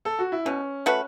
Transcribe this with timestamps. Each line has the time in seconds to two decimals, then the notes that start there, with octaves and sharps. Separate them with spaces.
0.05 A4
0.19 F#4
0.32 E4
0.45 B2 C#4
0.86 A3 F#4 B4